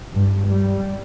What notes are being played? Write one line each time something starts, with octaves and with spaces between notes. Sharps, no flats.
G2
G3